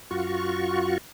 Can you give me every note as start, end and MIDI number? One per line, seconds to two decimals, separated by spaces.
0.11 0.98 42
0.11 0.98 65
0.11 0.98 66
0.11 0.98 85